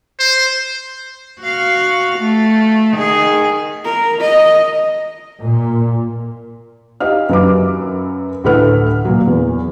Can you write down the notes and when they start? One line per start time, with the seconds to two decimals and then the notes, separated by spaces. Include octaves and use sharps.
0.20 C5
1.41 F#4 F5
2.19 A3
2.97 D#3 G#4
3.85 A#4
4.20 D#5
5.43 A#2
7.00 D#4 G4 D#5 F5 F6
7.29 F#2 F#3 B4 D6
8.44 D2 A2 A3 B4 F#5 F6
9.05 A#2 F#3
9.27 E2